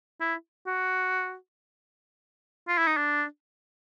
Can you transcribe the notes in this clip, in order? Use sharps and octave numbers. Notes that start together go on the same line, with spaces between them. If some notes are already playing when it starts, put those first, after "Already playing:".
E4
F#4
F4
E4
D#4
D4